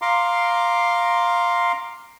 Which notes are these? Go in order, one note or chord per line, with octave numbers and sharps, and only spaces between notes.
F5 A#5 C6 D6